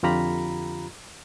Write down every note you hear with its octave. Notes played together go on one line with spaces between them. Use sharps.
F2 D3 F4 G4 A#5 B5